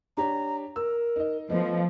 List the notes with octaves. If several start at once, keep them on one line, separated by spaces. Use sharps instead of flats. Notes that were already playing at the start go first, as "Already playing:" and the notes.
D4 G4 C#5 A#5
A#4 E6
D#4 D#5
F3 A3 B3 D#5